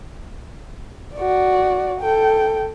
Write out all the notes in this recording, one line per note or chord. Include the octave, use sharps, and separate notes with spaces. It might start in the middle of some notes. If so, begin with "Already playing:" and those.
F#4 D5
A4 G5